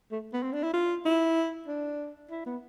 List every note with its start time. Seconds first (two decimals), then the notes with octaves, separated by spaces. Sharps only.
0.11 A3
0.33 B3
0.43 C4
0.53 D4
0.63 E4
0.73 F4
1.06 E4
1.67 D4
2.30 E4
2.46 B3